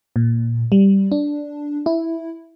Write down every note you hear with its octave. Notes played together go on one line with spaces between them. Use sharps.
A#2
G3
D4
E4